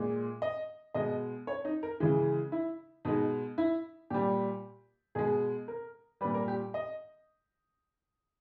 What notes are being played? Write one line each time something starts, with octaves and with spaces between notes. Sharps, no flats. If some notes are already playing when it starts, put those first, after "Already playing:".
Already playing: A#2 G#3
D#5
B2 G#3 D#5
C#5
D#4
A#4
C#3 E3 G#3
E4
B2 G#3 D#4
E4
A#2 G3 G4
B2 G#3 G#4
A#4
A#2 G3 B4
A#4
G4
D#5